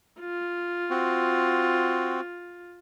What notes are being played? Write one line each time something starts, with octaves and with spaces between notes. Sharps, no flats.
F4
C4 F#4